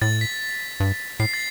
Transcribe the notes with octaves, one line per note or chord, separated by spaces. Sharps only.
A2 A6
B6
G2
A2 C7
A6